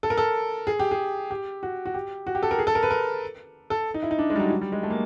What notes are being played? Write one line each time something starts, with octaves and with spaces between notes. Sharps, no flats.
A4
A#4
A4
G#4
G4
G#4
G4
F#4
F#4
G4
F#4
G4
A4
A#4
G#4
A4
A#4
B4
A#4
A4
D#4
E4
D#4
D4
G#3
G3
F#3
F#3
G3
G#3
A3
A#3